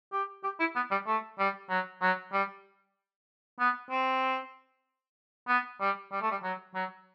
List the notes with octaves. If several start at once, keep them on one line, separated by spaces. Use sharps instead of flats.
G4
G4
E4
B3
G3
A3
G3
F#3
F#3
G3
B3
C4
B3
G3
G3
A3
G3
F#3
F#3